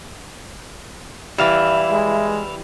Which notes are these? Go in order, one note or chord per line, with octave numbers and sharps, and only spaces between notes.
E3 G3 E4 E5 F5
G#3